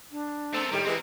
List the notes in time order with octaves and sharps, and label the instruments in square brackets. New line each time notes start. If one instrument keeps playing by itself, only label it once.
[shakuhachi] D4
[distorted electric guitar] A3 A#4 [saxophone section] C4 A4
[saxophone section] A2 D#3 [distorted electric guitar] G3 [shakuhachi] G4
[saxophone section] E3 G#3 [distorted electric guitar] C4 A#4